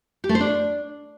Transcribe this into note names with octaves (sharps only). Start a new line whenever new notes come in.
G4
A3
C5
D4